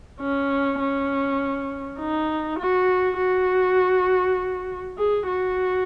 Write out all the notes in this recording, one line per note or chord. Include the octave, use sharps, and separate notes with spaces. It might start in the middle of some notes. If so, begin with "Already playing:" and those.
C#4
C#4
D#4
F#4
F#4
G#4
F#4